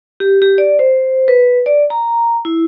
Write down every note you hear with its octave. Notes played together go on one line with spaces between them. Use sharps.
G4
G4
D5
C5
B4
D5
A#5
E4